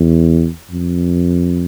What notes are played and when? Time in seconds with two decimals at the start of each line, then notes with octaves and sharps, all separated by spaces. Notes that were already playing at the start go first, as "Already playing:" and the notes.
Already playing: E2
0.71 F2